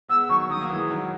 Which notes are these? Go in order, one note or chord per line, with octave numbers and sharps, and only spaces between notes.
G#3 B3 E6
D#3 F#3 C#6
D#3 F#3 D#6
A#3
E3 G#3
D#3 F#3